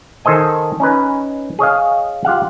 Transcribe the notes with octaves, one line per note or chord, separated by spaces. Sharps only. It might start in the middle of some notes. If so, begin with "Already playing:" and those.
D#3 A4 C5 D#5 G#5
C#4 D#4 B4
G#4 C#5 D#5 F5
F4 G4 F5 F#5